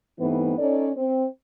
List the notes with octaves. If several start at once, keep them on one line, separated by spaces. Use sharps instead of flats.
G2 E3 A3 B3 C4 D#4
C#4 D#4 A4 C#5 D5
C4